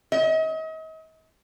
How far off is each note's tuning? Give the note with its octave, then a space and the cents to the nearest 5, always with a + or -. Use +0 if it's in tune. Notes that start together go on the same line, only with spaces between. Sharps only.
D#5 +40